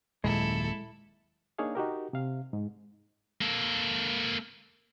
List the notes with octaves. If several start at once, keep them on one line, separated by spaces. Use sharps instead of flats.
D#1 F#2 A#2 G#3 E4 A4
A#3 D4 D#4 G#4 C#5 F5
D#4 F#4 G4 A#4
C3 F5
G#2
A#3 A4